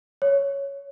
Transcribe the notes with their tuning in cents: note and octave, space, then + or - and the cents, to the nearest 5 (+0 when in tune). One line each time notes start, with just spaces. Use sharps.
C#5 +5